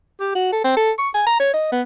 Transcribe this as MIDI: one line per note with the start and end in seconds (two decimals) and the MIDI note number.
0.20 0.35 67
0.35 0.51 66
0.53 0.63 69
0.64 0.72 60
0.77 0.91 69
0.98 1.09 85
1.14 1.23 80
1.26 1.36 82
1.40 1.53 73
1.54 1.69 75
1.72 1.82 59